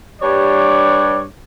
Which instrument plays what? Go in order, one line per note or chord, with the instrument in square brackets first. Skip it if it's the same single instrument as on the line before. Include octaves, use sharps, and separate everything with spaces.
[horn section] G2 C#5 D5